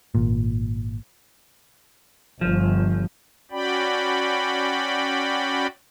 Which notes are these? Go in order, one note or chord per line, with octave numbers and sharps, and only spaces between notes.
G#1 A#2
G1 F3
C#4 F#4 D5 G5 B5